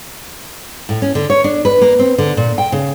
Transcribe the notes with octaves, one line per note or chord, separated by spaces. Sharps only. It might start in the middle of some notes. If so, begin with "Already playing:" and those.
A2
C#4
D3
C#5
D4
B4
A#3
C4
D3
A#2
G5
C#3